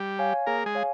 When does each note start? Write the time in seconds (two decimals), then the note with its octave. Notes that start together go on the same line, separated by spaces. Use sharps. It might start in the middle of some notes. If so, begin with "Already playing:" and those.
Already playing: G3 G4
0.19 C#5 F5 G#5
0.46 A#3 G#4 A#4
0.66 G#3 G#4
0.75 C#5 F5 G#5